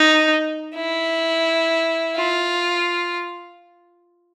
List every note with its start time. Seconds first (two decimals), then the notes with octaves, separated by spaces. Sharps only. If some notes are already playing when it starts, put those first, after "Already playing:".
Already playing: D#4
0.75 E4
2.16 F4